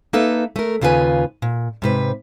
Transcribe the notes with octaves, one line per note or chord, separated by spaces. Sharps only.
A#3 D#4 A4 B4 E5
A3 A#4
D#2 C#3 F4 F#4 B4 G#5
A#2
G#2 C3 B4